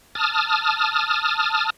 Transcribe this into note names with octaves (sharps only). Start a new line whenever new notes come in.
A5 D#6 F6